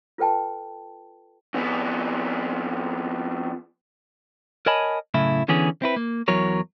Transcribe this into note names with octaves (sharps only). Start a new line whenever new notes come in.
F4 A4 B4 G5 A5
F2 B3
A#4 C#5 D#5 G#5 A5 B5
F#2 A2 C#3 E4
D3 E3 B3 C#4 G#4
C4 E4 B4
A#3
E2 E3 F#3 F#4 A#4 C#5